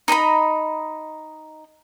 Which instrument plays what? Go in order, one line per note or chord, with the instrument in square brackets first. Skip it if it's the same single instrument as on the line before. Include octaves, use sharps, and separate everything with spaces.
[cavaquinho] D#4 D#5 A#5 B5